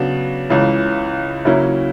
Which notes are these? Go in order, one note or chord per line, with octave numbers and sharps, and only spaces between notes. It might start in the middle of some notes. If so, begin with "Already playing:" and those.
Already playing: C#3 F#3 B3 D4
C#2 C#3 E3
C#3 F#3 A#3 C#4 E4